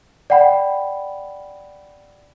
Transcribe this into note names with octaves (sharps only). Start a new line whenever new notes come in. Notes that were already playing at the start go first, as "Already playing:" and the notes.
D5 F#5 G5 B5